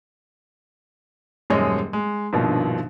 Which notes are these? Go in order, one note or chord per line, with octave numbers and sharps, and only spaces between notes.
D#1 F#2 G#3 G#4 C#5 D#5
G#3
A#1 G2 B2 D#3 F3